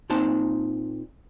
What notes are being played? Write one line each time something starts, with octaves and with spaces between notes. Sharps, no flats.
A#2 C4 D#4 A5